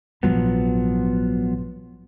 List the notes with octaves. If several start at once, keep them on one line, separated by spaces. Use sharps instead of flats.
A#1 G#2 F3 F#3 B3